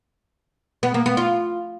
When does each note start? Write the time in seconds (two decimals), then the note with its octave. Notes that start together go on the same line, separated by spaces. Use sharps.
0.83 B3
0.94 A#3
1.06 B3
1.17 F4